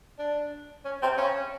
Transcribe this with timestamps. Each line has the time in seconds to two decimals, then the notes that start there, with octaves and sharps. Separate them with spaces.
0.19 D4
0.85 C#4
1.02 C4
1.18 C#4